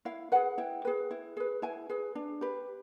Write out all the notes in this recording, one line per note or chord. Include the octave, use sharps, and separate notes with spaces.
E4 F5
G#4 B4 F#5
E4 G5
G#4 B4
E4
G#4 B4
E4 G#5
G#4 B4
D4
G4 B4